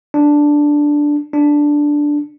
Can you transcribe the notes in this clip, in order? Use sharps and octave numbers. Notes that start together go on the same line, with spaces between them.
D4
D4